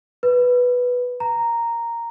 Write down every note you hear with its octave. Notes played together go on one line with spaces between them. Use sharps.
B4
A#5